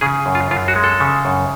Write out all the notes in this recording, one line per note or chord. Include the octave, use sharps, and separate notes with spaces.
C#3 G#4
F#2
F4
F#2 F4
F#4
G#3
A4
C#3
F#2